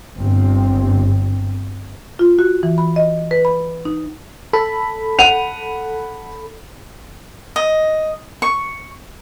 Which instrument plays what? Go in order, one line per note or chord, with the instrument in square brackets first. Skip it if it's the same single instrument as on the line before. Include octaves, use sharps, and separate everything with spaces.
[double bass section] G1 C4
[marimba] F4
F#4
E3
B5
D#5
B4
B5
D#4
[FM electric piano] A4 B5
[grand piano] F#5 D#7 F7
[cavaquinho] D#5
C#6